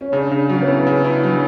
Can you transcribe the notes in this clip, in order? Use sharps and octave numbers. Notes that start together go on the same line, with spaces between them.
C#4
C#3 D4
C#3
F#3 C#4
B3
E4
C#3 C#4
E4
D4
F#3